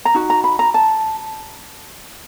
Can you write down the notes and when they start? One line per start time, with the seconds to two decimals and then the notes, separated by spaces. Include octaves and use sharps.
0.05 A#5
0.15 D#4 F#4
0.30 A#5
0.44 B5
0.59 A#5
0.74 A5